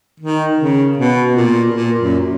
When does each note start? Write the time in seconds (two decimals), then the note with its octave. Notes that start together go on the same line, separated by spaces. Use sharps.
0.20 D#3
0.59 C#3
0.98 B2
1.36 A#2
1.74 A#2
2.01 F#2